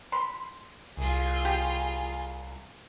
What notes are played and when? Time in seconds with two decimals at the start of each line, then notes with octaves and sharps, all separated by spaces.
0.12 B5 C6
0.97 C2 F4 G#4
1.45 G4